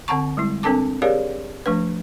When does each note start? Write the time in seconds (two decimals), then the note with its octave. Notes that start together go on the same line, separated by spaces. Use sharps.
0.08 D3 C4 F#5 A5 A#5 C#6
0.37 G3 G#3 E4
0.63 C4 D4 A4 A#4 A5 D6
1.02 G4 G#4 A#4 C#5 D5 F5
1.66 F3 A3 D4 B4